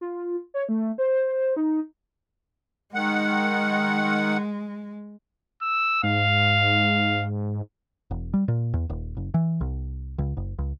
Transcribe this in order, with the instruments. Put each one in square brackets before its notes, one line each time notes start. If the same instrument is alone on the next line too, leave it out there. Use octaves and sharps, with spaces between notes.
[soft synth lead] F4
C#5
A3
C5
D#4
[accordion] D#3 F#5 [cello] G#3
[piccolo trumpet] E6
[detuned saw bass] G#2 [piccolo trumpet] F5
[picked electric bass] E1
G3
A#2
E2
D#1
F#1
E3
C2
C#2
F#1
C#2